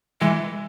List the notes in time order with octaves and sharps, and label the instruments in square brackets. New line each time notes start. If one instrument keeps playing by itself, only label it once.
[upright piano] E3 [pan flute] G#3